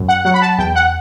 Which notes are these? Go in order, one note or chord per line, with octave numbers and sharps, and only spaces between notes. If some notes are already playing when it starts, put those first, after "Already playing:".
Already playing: F#2
F#5
F#3 F#5
B5
A5
E2 G5
F#5